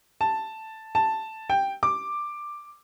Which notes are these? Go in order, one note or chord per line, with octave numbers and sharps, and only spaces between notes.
A5
A5
G5
D6